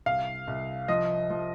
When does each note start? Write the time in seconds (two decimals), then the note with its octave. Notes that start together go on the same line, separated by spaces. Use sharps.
0.06 C2 F5
0.48 C2
0.88 F3 D#5
1.30 F3